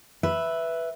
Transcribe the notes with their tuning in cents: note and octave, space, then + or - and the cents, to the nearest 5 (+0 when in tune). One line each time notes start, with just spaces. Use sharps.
B4 +0 E5 +0